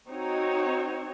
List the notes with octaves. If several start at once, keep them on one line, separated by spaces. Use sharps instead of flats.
C4 D#4 F#4 C#5